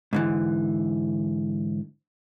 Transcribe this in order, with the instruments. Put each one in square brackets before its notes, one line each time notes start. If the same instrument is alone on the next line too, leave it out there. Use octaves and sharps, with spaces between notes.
[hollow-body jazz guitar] G#2 D3 E3